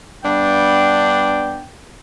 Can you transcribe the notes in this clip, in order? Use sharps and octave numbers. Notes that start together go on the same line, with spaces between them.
G2 B3 D4 G5